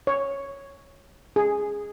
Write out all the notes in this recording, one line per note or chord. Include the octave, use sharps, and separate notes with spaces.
C#5
G#4